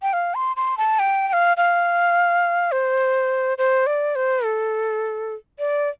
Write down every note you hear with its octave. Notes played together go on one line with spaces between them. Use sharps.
G5
F5
C6
C6
A5
G5
G5
F5
F5
C5
C5
D5
C5
A4
D5